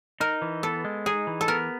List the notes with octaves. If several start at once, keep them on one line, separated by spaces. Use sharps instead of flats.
D#4 A#4
E3
B3 A4
G#3
D#4 G#4
E3
A4
B3 A#4